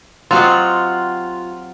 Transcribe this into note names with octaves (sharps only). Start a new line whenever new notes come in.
F#3 C4 F4 G4 D#5 F#5 C6 A6